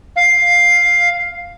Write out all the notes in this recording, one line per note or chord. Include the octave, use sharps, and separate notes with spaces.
F5